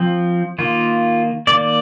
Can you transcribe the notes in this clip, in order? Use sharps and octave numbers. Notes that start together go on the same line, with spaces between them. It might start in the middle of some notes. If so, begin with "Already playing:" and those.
Already playing: F3 C4
D#3 A#3 F4
D#3 A#3 D5